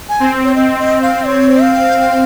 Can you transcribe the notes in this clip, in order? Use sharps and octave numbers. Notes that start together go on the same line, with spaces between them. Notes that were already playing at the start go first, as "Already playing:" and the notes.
G#5
C4
C#5
C4 D#5
D#5
F5
C#5
F5